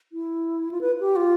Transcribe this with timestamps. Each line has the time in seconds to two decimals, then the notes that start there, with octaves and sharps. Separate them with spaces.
0.12 E4
0.71 F4
0.81 B4
1.00 G4
1.16 F4